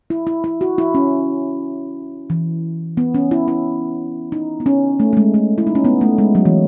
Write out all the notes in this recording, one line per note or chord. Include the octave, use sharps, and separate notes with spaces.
E4
E4
E4
F#4
E4
C#4
E3
B3
C#4
E4
E4
D#4
B3
C#4
A3
A3
G#3
A3
E4
D#4
C#4
B3
A3
G#3
F#3
E3